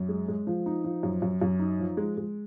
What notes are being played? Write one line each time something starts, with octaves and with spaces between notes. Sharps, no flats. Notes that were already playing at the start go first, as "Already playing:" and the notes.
Already playing: F#2
G#3
G#3
F3
D#4
F3
F#2
F#2
F#2
D#4
F3
G#3
G#3